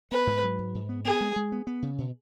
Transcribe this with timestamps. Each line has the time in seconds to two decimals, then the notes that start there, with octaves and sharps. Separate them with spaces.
0.12 B3 B4
0.27 G#2
0.43 F#3
0.59 G#2
0.75 G#2
0.89 B3
1.05 B3 G#4
1.21 G#3
1.36 G#3
1.52 B3
1.67 B3
1.82 C#3
1.98 B2